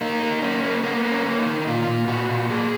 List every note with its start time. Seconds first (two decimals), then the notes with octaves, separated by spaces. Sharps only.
0.01 A#3 D#4
0.22 A#3
0.42 A#3 C#4
0.64 A#3
0.84 A#3 B3
1.05 A#3
1.11 C#4
1.26 A#3
1.39 D#4
1.46 D#3
1.62 D#4
1.66 A#2 F4
1.87 A#2
2.07 A#2 F#4
2.29 A#2
2.50 A#3 G#4